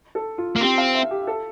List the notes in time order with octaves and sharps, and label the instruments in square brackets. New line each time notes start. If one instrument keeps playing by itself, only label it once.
[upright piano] A4
F4
[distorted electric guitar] A#3
[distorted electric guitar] C4 [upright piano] G4
[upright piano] F5
E5
G4
A4